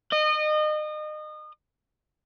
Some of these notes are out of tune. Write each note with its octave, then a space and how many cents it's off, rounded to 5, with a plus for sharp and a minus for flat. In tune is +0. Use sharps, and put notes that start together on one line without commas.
D#5 -30